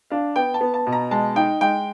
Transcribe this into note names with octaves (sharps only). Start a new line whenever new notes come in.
D4 F5
B3 G5
A5
B3
A5
B2
A#5
G#3 A5
D#4 G5
G#3 G5